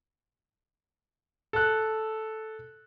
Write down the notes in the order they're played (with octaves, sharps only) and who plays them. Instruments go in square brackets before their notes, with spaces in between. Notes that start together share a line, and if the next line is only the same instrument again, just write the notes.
[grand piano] A4 F#6